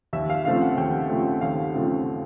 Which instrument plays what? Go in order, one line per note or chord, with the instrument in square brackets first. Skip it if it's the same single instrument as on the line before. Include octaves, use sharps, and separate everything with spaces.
[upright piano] D#2 E5
F5
C#3 F3 A3 C4 F5
F#5
D#2 G5
C#3 F3 A3 C4
D#2 F5
C#3 F3 A3 C4